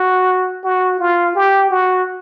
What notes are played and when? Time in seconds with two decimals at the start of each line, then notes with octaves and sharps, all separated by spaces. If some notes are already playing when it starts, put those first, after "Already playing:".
Already playing: F#4
0.64 F#4
1.00 F4
1.35 G4
1.71 F#4